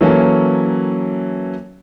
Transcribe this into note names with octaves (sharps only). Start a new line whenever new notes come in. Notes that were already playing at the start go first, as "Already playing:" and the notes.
E3 F#3 A#3 C#4 A4